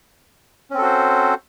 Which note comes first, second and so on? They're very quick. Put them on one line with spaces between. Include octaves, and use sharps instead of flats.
C#4 C4 A4 F#4 C5